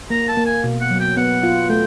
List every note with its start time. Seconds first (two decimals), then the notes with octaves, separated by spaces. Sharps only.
0.10 A#3 A#5
0.28 A5
0.37 A#3
0.46 G#5
0.64 B2
0.81 F#5
0.91 F#3
1.00 G5
1.17 B3 F#5
1.43 F4
1.70 A3 G5